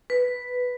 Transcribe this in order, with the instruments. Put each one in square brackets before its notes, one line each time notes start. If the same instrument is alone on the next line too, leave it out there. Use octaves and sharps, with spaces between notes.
[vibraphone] B4